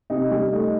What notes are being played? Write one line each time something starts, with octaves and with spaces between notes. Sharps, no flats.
C3 D#4
G3
A3 D#4